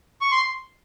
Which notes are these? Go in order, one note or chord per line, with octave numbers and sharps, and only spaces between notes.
C#6
C6